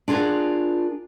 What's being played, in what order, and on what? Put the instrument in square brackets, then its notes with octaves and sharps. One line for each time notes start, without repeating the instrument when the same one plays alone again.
[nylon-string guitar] D4 F4 G#4 A#4 F#5